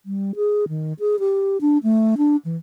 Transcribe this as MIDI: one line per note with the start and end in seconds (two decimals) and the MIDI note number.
0.06 0.31 55
0.36 0.68 68
0.68 0.93 51
0.99 1.19 68
1.19 1.57 67
1.61 1.78 62
1.83 2.15 57
2.17 2.36 62
2.45 2.57 52